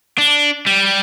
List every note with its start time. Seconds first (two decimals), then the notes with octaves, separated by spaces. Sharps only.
0.18 D4
0.66 G3